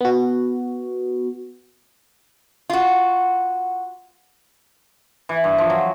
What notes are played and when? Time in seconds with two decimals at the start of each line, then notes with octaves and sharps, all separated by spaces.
0.01 B3 F#4
2.70 F4 F#4
5.29 E3
5.44 G2
5.58 F3
5.70 F#3